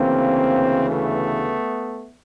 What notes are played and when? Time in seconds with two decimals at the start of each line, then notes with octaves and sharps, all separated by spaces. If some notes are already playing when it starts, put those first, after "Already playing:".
Already playing: D2 C#3 E3 A#3 C4
0.88 A3 B3